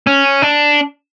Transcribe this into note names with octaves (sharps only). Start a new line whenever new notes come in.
C#4
D4